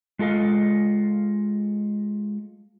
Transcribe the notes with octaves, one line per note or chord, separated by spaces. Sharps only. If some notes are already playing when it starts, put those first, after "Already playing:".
G#3 F4 A4 D#5 F5